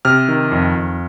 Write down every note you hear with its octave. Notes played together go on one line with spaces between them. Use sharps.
C3 F6
D#3
F2
F2